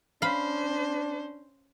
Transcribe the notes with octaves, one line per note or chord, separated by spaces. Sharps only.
C#4 D4 C5 F5 B5